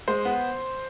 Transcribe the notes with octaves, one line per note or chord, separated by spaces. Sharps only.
G#3 C5
B3